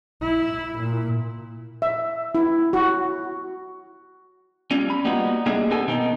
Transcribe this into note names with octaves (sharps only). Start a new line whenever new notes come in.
E4
A#2
E5
E4
F#4
G3 C4 C#4 F4
B5
G3 A#3 B3 D#4 F4 F#4
G3 A#3 D4 E4 G#4 D#5
B3 C4 D4 G4 A4 G#5
B2 D#3 C4 D#4